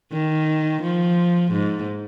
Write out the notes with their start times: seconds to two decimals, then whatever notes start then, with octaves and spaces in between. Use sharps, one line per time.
0.13 D#3
0.83 F3
1.52 G#2